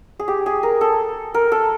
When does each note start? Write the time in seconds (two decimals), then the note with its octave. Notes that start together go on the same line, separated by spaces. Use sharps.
0.19 G#4
0.28 G4
0.46 G#4
0.63 A#4
0.81 A4
1.34 A#4
1.52 A4